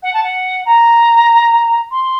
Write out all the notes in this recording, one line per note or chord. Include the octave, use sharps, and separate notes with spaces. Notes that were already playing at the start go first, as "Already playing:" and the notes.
F#5
A5
F#5
A#5
C6